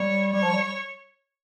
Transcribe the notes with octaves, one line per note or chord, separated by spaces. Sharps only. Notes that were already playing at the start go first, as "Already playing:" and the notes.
Already playing: G3 C#5
G3 C#5
F3
G3